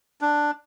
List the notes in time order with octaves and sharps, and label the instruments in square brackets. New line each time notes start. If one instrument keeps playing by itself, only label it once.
[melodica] D4